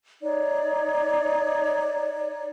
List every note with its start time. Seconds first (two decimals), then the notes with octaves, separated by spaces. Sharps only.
0.22 D#4 C#5 D5